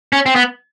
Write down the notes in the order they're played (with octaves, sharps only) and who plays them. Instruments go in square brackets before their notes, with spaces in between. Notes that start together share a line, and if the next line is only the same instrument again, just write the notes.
[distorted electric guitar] C#4
C4
B3